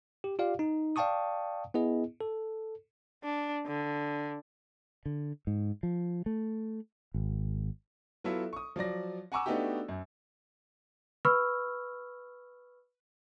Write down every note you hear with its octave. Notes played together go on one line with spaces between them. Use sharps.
G4
F4 G4 D5 F5
D#4
D5 F5 G5 A5 C#6 D#6
B3 E4 G#4 D#5
A4
D4
D3
D3
G#2
F3
A3
G#1
F#3 B3 E4 F4 A4 E5
C#6 D#6
F3 F#3 D5 A#6
F#5 G#5 A#5 C#6 D6 E6
A3 B3 D4 D#4 F#4 G4
F#2
B4 B5 C#6 E6 F6